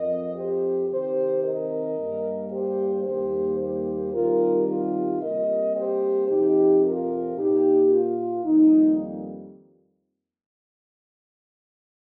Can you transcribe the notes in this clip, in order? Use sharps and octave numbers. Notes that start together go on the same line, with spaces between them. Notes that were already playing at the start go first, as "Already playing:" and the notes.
Already playing: F2 F3 C4 A#4 D#5
G4 C5
C3 D#3 C4 G4 C5
A#4 D#5
G2 G3 A#3
G4 C5
D#2 D#3 G3 A#3 G4 C5
G4 C5
C3 D#3 G3 F4 A#4
F4
C3 G3 A#3 A#4 D#5
G4 C5
F2 C3 F3 C4 D#4 G4
F4 A#4
A#2 A#3 D#4 G4
F4
F2 D#3 G3 A#3 D#4